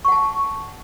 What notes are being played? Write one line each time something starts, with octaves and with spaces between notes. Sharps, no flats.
F#5 A5 C#6